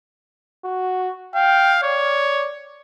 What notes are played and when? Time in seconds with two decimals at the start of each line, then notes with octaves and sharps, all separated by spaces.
0.65 F#4
1.35 F5 G5
1.83 C#5 D5